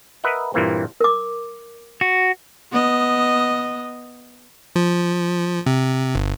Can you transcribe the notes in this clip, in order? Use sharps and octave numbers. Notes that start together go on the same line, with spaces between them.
A#4 B4 D#5 E5 F#5
G2 A#2 E3 A#3 C4
A#4 D6
F#4
B3 D#5
F3
C3
G1